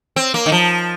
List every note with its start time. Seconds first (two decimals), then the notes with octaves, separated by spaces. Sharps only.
0.16 C4
0.34 A#3
0.46 D#3
0.52 F3